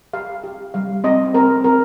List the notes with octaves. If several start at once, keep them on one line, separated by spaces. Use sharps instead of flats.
G4 F5
G4
G3 F5
C4 D#5
C4 A#4
C4 A#4